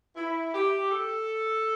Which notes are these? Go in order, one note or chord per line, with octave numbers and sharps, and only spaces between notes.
E4
G4
A4